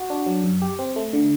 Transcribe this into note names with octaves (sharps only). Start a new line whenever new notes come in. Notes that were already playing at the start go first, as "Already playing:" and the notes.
Already playing: F#4
D4
F#3
F#2
G4
C4
A3
D3